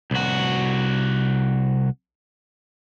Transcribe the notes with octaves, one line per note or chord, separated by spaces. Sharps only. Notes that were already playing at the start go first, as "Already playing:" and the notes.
C2 F#4